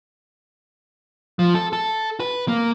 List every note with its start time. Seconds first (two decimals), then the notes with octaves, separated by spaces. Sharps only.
1.39 F3
1.55 A4
1.73 A4
2.20 B4
2.48 A#3